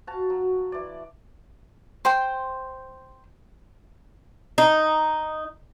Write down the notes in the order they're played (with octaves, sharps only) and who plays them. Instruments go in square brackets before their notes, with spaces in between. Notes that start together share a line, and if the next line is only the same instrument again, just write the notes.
[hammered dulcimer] F#4 F5 A5
F#3
E3 D5
[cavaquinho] C5 G5 C6
[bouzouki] D#4